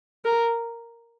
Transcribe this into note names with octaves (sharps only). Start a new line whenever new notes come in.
A#4